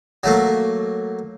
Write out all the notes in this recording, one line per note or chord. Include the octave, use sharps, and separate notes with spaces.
F#3 A3 A#3